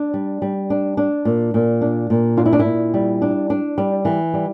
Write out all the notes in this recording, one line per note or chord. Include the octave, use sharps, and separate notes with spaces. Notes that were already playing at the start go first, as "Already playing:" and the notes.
Already playing: D4
G3
G3
D4
D4
A#2
A#2
D4
A#2
D4 F4
E4
D4
E4
A#2
G3
D4
D4
G3
E3
G3